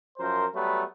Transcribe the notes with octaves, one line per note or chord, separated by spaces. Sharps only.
F#2 F3 A#4 C5
F#3 G3 A3 B3 B4